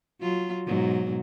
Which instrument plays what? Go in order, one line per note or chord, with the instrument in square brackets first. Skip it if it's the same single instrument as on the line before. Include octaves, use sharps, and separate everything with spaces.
[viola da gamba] F#3 F4
G#2 B2 F#3